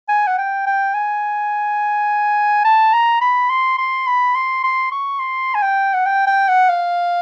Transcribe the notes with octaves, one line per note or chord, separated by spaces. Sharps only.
G#5
F#5
G5
G5
G#5
A5
A#5
B5
C6
C6
B5
C6
C6
C#6
C6
G#5
G5
F#5
G5
G5
F#5
F5